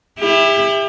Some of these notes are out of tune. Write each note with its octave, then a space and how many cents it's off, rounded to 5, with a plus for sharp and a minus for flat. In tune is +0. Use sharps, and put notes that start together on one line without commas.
E4 +0 G4 +35